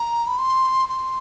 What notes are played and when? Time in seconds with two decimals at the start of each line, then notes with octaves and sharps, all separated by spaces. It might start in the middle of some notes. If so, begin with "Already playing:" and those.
Already playing: A#5
0.27 B5
0.38 C6
0.89 C6